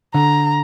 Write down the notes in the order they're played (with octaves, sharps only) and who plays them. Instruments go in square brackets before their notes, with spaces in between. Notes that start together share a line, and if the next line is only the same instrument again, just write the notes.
[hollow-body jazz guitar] D3 [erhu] A#5